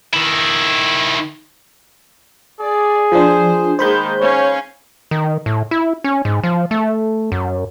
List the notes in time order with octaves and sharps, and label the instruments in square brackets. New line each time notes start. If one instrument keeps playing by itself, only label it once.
[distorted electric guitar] D#3 E4
[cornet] G#4 [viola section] D5
[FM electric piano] F3 D4 [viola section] C5
[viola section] D#3 G#3 A#3 [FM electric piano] C5 B5 G6
[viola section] C#4 F5 [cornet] C#5
[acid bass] D#3
A2
E4
C#4
G#2
F3
A3
F#2